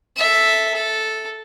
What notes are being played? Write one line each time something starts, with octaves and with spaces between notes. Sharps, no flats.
A4 E5
A4